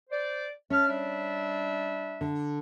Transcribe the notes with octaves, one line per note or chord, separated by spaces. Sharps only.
C5 D5
C#4 E5 A5 F6
G3 D4 E5
D3